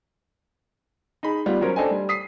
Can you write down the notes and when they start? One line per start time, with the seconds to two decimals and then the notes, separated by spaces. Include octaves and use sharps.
1.23 D#4 G#4 B5
1.46 G3 B3 F4
1.61 F#3 C#4 A#4 C5 C#5
1.76 D4 A4 C5 D#5 G5 G#5
1.91 G3
2.09 D#6 B6 C7